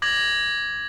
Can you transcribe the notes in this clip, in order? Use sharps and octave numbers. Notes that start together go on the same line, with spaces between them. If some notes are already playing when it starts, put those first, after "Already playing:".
D6 G#6 A#6 F#7